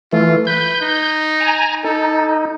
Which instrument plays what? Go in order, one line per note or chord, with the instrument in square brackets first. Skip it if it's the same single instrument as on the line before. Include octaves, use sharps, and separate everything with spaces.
[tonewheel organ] E3 A3 [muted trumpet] F4
[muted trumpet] B4 [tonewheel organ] G6
[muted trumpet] D#4
[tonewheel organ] G#5 A#5
[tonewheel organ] D#4 [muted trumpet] A4